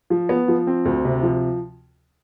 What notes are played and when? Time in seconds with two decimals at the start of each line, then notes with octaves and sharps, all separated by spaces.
0.10 F3
0.29 B3
0.48 F3
0.67 C4
0.85 D2
1.05 C3
1.23 F3